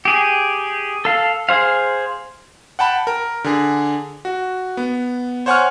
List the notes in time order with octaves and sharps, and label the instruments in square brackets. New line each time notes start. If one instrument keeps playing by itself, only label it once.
[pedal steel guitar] G4 G#4
A4 F5
G#4 C5 F5
[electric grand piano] F#5 G5 A5 B5
A#4
D3 G#4
F#4
B3
C5 C#5 F#5 G#5 C#6 F6